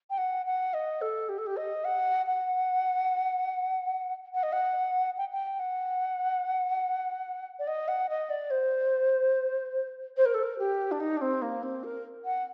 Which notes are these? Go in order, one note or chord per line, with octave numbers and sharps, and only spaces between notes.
G5
F#5
F#5
D#5
A4
G4
A4
G4
D#5
F#5
F#5
F#5
D#5
F#5
G5
G5
F#5
D5
D#5
F#5
D#5
D5
C5
C5
A#4
A4
A#4
G4
D4
D#4
D4
C4
A#3
C4
A#4
F#5